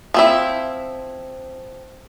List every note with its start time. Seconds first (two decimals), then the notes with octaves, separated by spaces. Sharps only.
0.14 F3 C4 E4